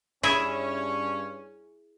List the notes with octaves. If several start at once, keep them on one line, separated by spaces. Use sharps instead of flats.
G2 C#4 E4 G#4 E5